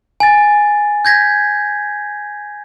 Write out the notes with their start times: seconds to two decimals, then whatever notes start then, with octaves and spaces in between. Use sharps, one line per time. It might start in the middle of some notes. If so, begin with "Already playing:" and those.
0.20 G#5 A6
1.05 G6 G#6 A#6 B6